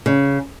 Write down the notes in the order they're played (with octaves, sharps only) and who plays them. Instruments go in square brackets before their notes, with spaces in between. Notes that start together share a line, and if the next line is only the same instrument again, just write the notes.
[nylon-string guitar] C#3